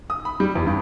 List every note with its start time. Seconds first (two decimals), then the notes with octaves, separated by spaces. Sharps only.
0.10 D#6
0.25 B5
0.40 G3
0.55 E2
0.67 G2